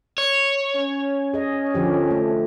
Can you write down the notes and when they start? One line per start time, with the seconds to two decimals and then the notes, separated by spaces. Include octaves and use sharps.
0.18 C#5
0.75 C#4
1.34 G#4 D#5
1.74 D3 F3 G4
2.11 A3